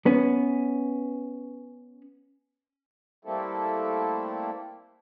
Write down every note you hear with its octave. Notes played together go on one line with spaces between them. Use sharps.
B3 C#4
G3 A3 A#3 C4 E4 A4